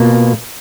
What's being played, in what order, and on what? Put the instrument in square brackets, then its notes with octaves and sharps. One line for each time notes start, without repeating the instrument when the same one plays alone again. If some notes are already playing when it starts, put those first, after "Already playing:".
Already playing: [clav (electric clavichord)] B2 A#3 F4